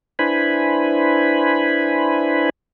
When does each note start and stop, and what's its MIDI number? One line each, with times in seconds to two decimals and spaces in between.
0.19 2.50 62
0.19 2.50 64
0.19 2.50 71
0.19 2.50 72
0.19 2.50 80
0.19 2.50 83